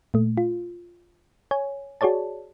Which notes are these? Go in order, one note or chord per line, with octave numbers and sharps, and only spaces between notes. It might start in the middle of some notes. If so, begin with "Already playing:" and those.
A#2 A3
F4
C#5 G#5
F#4 G#4 C#5 D5 A5